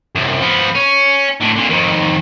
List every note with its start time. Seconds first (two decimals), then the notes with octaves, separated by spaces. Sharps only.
0.15 C2 F#2
0.40 F3 B3
0.75 C#4
1.41 A2 D3
1.56 A#2 D3
1.70 F2 D#3